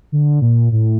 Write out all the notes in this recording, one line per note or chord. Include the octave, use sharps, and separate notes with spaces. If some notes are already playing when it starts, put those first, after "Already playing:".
D3
A#2
A2